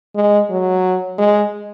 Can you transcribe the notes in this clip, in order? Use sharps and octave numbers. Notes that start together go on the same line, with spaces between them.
G#3
F#3
G#3